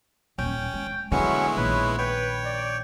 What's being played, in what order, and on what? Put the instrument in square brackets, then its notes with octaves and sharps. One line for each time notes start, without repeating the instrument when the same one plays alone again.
[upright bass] D#1 [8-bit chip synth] C#4 [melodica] G5
[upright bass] G#3
[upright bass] D3 [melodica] F#3 C#4 C#6 [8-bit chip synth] G#3 B3 E4 [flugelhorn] A3
[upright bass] A#1 D#3 [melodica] B4 [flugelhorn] C#5
[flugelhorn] B4 [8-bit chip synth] C#5 [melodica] G5
[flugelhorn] D5